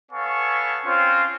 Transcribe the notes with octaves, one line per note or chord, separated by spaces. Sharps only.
B3 A4 C#5 F5 G#5 C#6
C4 C#4 F4